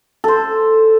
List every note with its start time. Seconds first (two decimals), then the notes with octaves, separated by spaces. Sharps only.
0.24 A4 C5